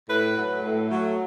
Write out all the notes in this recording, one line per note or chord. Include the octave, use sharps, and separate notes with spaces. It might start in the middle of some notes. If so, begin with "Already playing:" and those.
A2 B4
F#3 A3
A2
F#3 A3